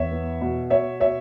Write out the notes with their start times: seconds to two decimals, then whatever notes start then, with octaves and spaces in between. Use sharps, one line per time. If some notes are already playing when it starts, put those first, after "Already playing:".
Already playing: E2 C#5 E5
0.12 B3
0.41 B2
0.70 B2 C#5 E5
1.00 B2 C#5 E5